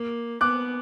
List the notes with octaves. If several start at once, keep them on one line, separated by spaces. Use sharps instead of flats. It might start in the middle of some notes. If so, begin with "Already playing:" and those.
Already playing: A#3
B3 D6 F#6